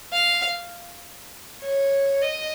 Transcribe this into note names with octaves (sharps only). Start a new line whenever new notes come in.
F5
C#5
D#5